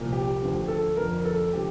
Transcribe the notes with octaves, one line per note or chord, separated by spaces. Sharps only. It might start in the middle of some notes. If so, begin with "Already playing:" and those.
Already playing: C2 A#2 F3
G4
D2 D3 F3
A4
F2 D3 F3 A#4
A4
D3 F3 G4